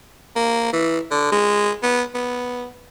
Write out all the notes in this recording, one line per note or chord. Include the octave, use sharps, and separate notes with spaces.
A#3
E3
D3
G#3
B3
B3